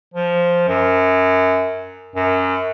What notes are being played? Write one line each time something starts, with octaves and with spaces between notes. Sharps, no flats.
F3
F#2
F#2